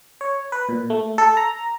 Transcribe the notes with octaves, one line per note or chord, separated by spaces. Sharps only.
C#5
B4
A#2
A3
A4
A#5